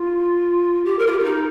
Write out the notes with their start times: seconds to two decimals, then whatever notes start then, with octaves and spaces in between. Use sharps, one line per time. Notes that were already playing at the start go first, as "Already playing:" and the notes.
Already playing: F4
0.84 G4
0.98 A#4
1.06 F4
1.11 G4
1.19 F4
1.24 D#4